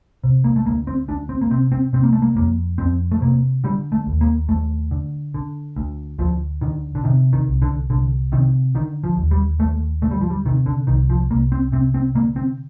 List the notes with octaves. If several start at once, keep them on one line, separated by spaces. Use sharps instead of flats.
C3
A#3
A3
D2 A#3
C4
D2 D4
C4
A#3
C3 C4
C4
C3 C4
A#3
A3
A#3
F2 A#3
F2 C4
A3
C3 A#3
D3 G3
A3
D#2
A#3
D#2 A3
D3
D3
D2
D2 F3
D3 D#3
D3
C3 D#3
D#3
C2
D3
C2 D3
C3 D#3
D3 D#3
F3
D#2
G3
D#2 A3
D3 A3
G3
F3
G3
C3 D#3
D3
C2 D#3
F3
C2 A#3
C4
C3 C4
C4
D3 A#3
C4